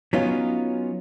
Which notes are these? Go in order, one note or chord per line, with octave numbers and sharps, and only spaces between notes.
F#3 B3 C#4 D#4 F4